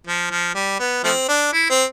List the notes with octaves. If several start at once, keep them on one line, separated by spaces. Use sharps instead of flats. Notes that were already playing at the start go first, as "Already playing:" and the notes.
F3
F3
G3
B3
F3 A3 C4
D4
E4
C4